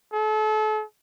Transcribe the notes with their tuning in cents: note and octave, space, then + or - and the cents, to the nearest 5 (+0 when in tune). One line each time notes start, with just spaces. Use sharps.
A4 -35